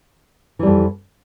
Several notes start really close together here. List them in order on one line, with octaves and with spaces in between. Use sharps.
E3 G3 F2